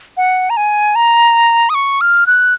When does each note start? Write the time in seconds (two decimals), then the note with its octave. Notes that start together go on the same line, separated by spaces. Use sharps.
0.17 F#5
0.50 A#5
0.57 G#5
0.95 A#5
1.70 D#6
1.75 C#6
2.01 F6
2.27 F#6